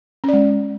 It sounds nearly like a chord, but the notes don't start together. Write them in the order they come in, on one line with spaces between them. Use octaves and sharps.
C#4 D5 G#3